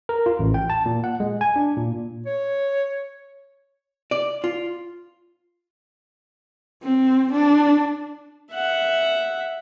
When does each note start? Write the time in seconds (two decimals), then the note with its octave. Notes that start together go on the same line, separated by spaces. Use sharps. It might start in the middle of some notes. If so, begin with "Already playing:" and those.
0.09 A#4
0.26 F4
0.39 A1
0.54 G5
0.70 A5
0.86 A#2
1.04 F#5
1.20 G#3
1.41 G#5
1.56 D4
1.77 A#2
2.26 C#5
4.11 D5
4.44 F4
6.83 C4
7.32 D4
8.52 E5 F#5